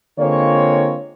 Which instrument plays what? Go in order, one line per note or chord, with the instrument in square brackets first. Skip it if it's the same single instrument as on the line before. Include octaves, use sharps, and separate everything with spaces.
[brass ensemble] D3 G#3 A#3 C4 F4 C#5